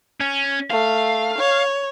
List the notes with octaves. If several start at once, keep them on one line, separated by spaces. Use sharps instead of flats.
C#4
A3 F5
C#5